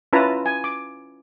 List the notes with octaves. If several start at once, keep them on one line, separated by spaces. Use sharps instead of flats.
C#4 E4 F4 B4 A5 A#5
G#5
D6